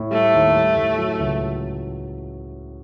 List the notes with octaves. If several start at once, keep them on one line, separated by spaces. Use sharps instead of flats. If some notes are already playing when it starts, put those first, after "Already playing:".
Already playing: A2
G3 A3
D#2
G3
A2
F#3
C#2